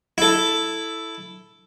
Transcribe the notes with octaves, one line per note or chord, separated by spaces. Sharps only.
E4 A4